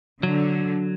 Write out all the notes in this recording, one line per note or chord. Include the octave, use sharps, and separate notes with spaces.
D3 F#3